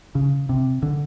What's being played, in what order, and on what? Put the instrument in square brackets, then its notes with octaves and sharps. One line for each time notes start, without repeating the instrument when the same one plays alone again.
[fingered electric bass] C#3
C3
D3